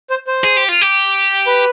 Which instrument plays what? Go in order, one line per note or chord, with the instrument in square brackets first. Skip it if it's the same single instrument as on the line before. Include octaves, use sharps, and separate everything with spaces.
[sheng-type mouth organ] C5
C5
[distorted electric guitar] G#4
G4
F4
G4
[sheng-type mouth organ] B4